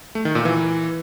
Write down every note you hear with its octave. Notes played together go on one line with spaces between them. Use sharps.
A3
D#3
A#2
E3